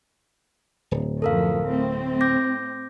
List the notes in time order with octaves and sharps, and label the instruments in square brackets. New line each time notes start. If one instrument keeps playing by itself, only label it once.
[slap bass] D1
[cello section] F#2 F3 [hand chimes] A4 A#4 F5
[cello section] A2 C4
[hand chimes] D6 G6 A#6